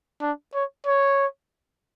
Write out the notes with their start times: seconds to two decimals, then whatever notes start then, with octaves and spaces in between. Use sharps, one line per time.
0.21 D4
0.54 C#5
0.86 C#5